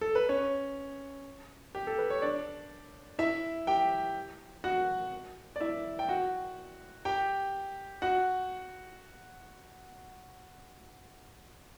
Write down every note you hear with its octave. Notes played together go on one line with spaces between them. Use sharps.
A4
B4
C#4 C#5
G4
A4
B4
C#5
D4 D5
E4 E5
G4 G5
F#4 F#5
D5
E4 E5
G5
F#4 F#5
G4 G5
F#4 F#5